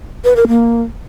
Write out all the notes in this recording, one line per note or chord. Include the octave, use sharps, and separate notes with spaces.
B4
A#4
A#3